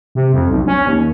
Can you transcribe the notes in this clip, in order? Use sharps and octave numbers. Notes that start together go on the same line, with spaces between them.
C3
F2
B1
C#4
D#2